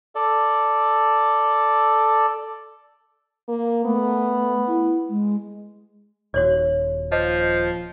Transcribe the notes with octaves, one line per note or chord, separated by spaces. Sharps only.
A4 D5
A#3
A3 B3
E4
G#3
D#1 F#4 C#5 D5
F3 D#5